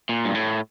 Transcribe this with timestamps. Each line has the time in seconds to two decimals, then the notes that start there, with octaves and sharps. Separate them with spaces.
0.09 A#2
0.25 G2
0.35 A2